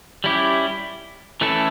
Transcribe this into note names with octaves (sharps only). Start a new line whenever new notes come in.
G3 C#4 E4 G4
E3 A3 C#4 E4 A4